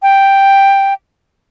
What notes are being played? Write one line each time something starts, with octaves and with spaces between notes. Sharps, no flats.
G5